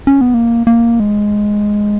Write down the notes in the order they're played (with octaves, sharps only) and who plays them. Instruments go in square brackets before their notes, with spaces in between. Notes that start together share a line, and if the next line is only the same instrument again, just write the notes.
[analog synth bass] C#4
B3
A#3
A#3
G#3